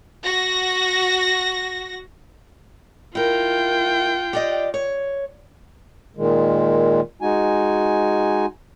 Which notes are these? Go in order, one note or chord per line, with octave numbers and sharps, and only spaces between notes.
F#4 A#6
E4 F4 A#4 G5
G4 D5 D#5
C#5
A#2 D#3 G#3
G#3 D#4 F#4 G#5